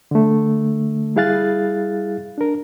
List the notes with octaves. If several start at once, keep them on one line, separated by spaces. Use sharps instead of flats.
D3 A3
G3 E4 G#4 F5 F#6 A6
D4 A#4